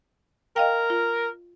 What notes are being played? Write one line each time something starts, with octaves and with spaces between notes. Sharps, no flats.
A#4 D#5 F5 G5
F4